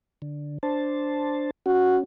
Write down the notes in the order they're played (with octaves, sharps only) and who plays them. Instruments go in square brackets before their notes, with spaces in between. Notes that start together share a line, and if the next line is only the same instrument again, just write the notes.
[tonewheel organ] D3
D4 C5 A5
[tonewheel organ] C#4 [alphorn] F#4